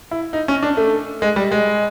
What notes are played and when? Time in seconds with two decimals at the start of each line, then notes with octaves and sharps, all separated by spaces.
0.11 E4
0.33 D#4
0.48 C#4
0.63 D4
0.77 A3
1.22 G#3
1.36 G3
1.52 G#3